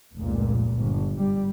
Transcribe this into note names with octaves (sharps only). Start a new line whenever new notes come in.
F1 C#2 A#2
G1
G#2 G3